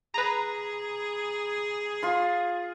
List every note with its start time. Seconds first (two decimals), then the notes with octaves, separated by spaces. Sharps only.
0.14 G#4 B4 A#5
2.03 F4 C6